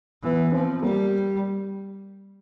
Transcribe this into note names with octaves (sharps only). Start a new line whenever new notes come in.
E3 B3
B3
F3 C4
G3 A#3